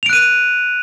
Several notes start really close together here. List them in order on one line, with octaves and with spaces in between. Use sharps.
F7 D7 F#6 D#7